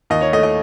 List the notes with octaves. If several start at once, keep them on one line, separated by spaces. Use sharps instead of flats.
D#2 D#5
C#5
A3 D#5
D#5